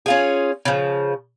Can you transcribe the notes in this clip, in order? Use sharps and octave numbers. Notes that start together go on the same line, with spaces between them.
C#4 F4 G#4
C#3 F3